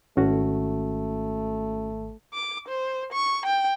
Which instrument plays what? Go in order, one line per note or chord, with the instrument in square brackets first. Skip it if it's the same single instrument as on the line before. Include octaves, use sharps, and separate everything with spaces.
[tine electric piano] G#1 [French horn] A3 [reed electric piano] C#4 F#4
[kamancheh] D6
C5
C#6
G5